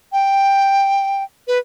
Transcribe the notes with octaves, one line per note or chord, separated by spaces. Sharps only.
G5
B4